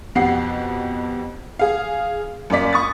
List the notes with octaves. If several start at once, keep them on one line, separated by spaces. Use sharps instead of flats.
F2 B2 G4 F#5 C7
G#4 F5
F#2 A#3 D5 B6
C#6 D#6 A6